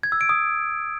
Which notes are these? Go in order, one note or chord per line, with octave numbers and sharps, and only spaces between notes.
G#6
E6
D7
D#6